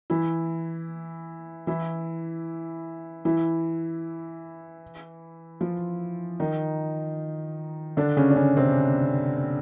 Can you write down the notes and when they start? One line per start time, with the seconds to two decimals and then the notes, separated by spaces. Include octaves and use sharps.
0.10 E3 E4
1.67 E3 E4
3.25 E3 E4
5.61 F3 F4
6.40 D#3 D#4
7.97 D3 D4
8.17 C#3 C#4
8.30 D4
8.36 C#3 C#4
8.57 C3 C4